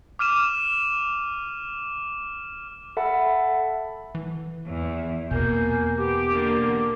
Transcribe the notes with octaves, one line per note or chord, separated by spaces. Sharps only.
D6 F6 D#7 E7
A4 E5 F#5 A5 B5
E3
E2
E2 B2 A#3 G#5 G6
B3 G4 D6
D3 A#3